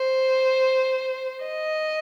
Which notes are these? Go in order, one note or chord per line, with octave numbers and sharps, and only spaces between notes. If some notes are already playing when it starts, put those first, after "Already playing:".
Already playing: C5
D#5